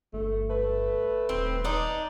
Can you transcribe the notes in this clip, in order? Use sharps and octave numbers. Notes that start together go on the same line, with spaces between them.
G1 A3
A3 B4
D#1 C4
D4 D#4